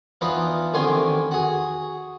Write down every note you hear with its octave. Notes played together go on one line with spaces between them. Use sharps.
E3 B3 D4 D#4 F4
A1 D3 D#3 C4 G#5 C6
F#4 G#4